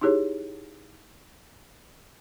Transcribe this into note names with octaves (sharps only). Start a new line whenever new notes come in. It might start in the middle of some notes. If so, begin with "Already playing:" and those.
D#4 E4 G4 G#4 C#5